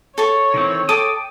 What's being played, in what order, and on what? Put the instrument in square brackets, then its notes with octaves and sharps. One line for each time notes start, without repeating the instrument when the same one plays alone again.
[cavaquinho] A4 C#6 [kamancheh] C#5
[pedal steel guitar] D#3 E3 C4
[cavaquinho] A4 [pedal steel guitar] G5 D6 D#6